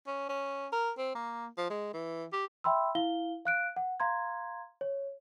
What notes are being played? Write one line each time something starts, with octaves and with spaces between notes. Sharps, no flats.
C#4
C#4
A#4
C4
A#3
F3
G#3
E3
G4
E5 G5 B5 C6 E6
E4 F5 G7
F5 F#6 D7
F#5
F5 A#5 C6 G#6
C#5